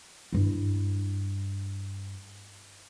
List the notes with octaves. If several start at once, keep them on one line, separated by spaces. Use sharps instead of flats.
G2 E4